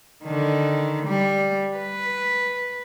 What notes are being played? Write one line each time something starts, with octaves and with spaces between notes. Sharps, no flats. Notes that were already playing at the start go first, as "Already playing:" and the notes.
D3 D#3
G3
B4